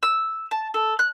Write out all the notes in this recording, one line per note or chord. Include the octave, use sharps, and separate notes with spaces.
E6
A5
A4
F#6